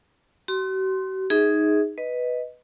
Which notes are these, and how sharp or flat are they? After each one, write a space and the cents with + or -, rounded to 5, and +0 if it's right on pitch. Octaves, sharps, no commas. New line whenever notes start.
F#4 +45 C6 +0
D#4 +0 G#4 +0 E5 -40
B4 +0 D#5 +5